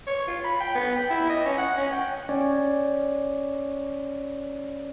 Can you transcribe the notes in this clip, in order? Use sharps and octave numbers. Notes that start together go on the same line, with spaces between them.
C#5
F4
B5
G5
B3
G5
E4
D#5
C#4
F#5
C#4
G5
C#4 C#5 D5